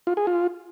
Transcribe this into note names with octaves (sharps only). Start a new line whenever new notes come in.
F4
G#4
F4